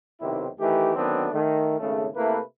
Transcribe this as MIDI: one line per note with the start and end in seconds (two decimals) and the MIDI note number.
0.21 0.47 35
0.21 0.47 48
0.21 0.47 51
0.21 0.47 60
0.21 0.47 64
0.21 0.47 67
0.60 0.93 51
0.60 0.93 52
0.60 0.93 57
0.60 0.93 67
0.96 1.28 38
0.96 1.28 51
0.96 1.28 54
0.96 1.28 59
0.96 1.28 60
0.96 1.28 62
1.33 1.77 51
1.33 1.77 57
1.79 2.08 32
1.79 2.08 49
1.79 2.08 57
2.15 2.39 48
2.15 2.39 57
2.15 2.39 58
2.15 2.39 64
2.15 2.39 71